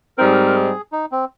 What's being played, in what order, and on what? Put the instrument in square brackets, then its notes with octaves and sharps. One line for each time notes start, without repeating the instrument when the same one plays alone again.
[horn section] G#2 G3 C4 D#4 [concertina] A#4
[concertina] G#4
A#4
A#4
G#4
D#4
C4